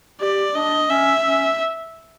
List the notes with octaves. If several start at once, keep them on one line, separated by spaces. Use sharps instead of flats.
G4 D5
D4 D#5
C#4 E5
C#4